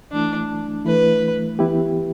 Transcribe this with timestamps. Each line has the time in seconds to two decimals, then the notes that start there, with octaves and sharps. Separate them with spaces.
0.12 E3 A3 D4 E4
0.85 E3 A3 E4 B4
1.59 E3 B3 E4 G4